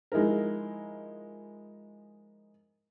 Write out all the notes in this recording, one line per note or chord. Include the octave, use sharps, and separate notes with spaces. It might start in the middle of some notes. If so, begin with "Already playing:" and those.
F3 G#3 D#4 E4 A#4